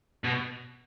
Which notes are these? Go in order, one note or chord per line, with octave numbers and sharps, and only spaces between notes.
B2